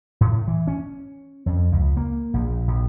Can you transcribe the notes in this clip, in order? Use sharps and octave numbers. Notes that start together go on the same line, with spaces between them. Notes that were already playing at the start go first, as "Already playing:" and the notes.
A2
E3
C#4
F2
C#2
A#3
A#1
A#1